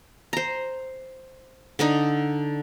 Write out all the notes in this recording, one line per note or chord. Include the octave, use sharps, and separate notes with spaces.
C5 A#5
D3 D4 D#4